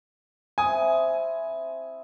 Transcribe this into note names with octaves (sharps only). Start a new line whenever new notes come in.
C4 E4 G#5 D#6